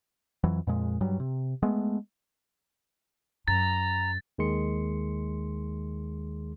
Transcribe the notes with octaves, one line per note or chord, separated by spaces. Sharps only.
F2 E3 F#3
F2 A#2 G#3
G2 F#3 G3
C3
G#3 A3 B3
F#2 A#5 A6
D#2 D#3 G#3 G#4 C6 C#7